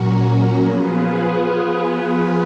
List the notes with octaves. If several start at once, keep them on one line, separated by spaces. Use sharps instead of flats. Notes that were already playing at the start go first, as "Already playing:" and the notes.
Already playing: A#2 F#3 C#4 F#4 A#4
F3 B3 F4 G#4 B4